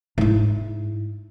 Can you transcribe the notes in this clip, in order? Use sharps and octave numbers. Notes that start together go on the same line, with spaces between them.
G#2 E4